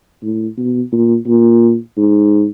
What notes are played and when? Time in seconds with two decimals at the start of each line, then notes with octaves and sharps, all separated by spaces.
0.23 A2
0.57 B2
0.92 A#2
1.27 A#2
1.97 G#2